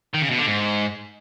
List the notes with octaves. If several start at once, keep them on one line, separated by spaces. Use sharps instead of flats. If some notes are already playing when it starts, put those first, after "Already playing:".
D#3
C#3
B2
D3
G#2